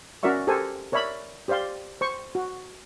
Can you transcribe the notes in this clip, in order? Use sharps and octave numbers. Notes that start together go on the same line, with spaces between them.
C#4 F#4 A#4 D5 E5 C#6
G4 A4 A#4 C5 G#5
A#4 C#5 D5 E5 B5
G4 C5 D5 F5 C6
C5 C#6
F#4